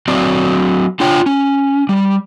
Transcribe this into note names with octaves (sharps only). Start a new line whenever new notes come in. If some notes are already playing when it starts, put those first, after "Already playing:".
F#3 C4 D5
D4 F4 C#5 G5
C#4
G3